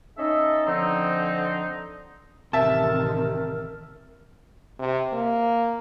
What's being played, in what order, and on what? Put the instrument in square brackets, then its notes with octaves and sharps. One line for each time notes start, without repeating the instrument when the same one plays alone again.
[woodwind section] C#4 D#4 A4 D#5 E5
D3 F3 C4 D#4
[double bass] A1 D#3 [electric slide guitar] C3 [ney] A#4 [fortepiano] E5 A5
[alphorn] C3
A#3